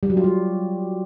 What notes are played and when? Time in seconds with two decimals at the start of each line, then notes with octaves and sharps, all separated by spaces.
0.03 G3
0.10 F#3
0.17 F4
0.24 G3